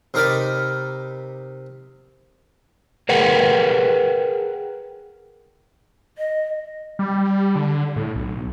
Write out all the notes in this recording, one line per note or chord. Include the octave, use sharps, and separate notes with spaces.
C3 D#4 A#4 D5 B5
G#4 A#4 B4 F#5 G5
D#5
G3
D3
A2
B1